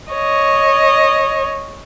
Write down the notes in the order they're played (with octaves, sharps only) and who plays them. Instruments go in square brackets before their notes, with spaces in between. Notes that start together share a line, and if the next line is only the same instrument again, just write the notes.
[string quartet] C#5 D#5